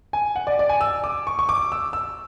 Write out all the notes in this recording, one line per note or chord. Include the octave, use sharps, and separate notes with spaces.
G#5
F#5
D5
D5
G#5
E6
D6
C#6
C#6
D6
E6
E6